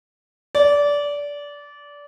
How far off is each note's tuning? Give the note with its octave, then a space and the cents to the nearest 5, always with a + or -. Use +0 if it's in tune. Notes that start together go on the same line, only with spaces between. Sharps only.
D5 -20